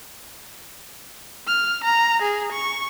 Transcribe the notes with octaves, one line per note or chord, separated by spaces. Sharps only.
F6
A#5
G#4
C#6